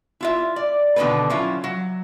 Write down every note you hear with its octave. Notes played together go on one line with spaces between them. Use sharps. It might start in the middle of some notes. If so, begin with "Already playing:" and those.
E4 F4 E5
D5
B2 D3 D#3 C4 A4 B4
F#3 C#4 E4 F4
F#3